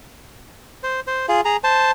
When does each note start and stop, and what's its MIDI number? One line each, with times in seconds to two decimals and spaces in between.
0.83 1.00 72
1.07 1.26 72
1.29 1.41 65
1.29 1.41 68
1.45 1.57 68
1.45 1.57 82
1.64 1.91 72
1.64 1.91 81